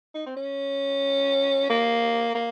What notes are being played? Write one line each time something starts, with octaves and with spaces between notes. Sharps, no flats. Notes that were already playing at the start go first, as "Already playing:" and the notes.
D#4
C4
C#4
A#3
A#3